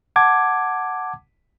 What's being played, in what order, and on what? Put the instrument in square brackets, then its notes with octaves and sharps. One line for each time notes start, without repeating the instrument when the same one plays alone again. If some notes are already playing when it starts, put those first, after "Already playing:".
[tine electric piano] F#5 A5 D6 G#6